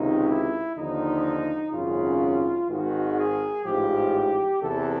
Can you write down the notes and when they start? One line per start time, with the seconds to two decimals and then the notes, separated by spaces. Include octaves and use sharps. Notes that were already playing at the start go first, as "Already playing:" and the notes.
Already playing: C#2 C3 D#3 D#4
0.29 E4
0.77 D#2 D3 F3 D#4
1.72 G#1 F#2 C#3 F4
2.69 G#1 G#2 D#3 F#4
3.16 G#4
3.64 A1 G#2 F3 G4
4.61 E2 C3 E3 A4